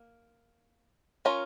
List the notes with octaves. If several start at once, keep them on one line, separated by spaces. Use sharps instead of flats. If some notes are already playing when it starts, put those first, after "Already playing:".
Already playing: A#3
C#4 F4 A#4 C#5